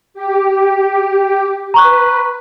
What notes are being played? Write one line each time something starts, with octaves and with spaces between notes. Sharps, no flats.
G4
B4 A#5 C#6 F#6